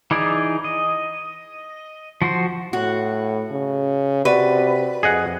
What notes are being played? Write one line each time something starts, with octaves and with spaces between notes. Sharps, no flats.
E3 D#4 G#4 D5
D#5
F3 F#4 C5
A2 F#4
C#3
C3 F#4 B4 D5
F2 G#4 D#5 F#5